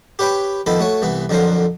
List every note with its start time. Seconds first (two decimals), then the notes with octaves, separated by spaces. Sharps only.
0.19 G4 B4 C#5 G5 B5
0.66 D#3 F3 B3 F4 A4 B5
0.80 A3 F#4 C#5
1.02 C2 E3 B3
1.29 F2 D3 F3 F#3 A#4 C5